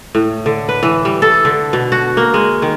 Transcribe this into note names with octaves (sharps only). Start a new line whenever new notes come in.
A2
D3
B4
E3
G3
A4
D3
B2
F#4
A#3
G#3
D#3